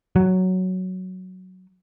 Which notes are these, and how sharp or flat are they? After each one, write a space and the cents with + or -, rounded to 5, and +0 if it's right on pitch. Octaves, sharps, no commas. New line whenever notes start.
F#3 +5